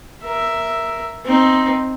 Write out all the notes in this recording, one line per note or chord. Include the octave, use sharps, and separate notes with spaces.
A#4 E5
C4 D#4